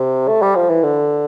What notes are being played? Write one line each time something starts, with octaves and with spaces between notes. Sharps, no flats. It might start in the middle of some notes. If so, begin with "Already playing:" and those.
Already playing: C3
A3
G3
F3
E3
D3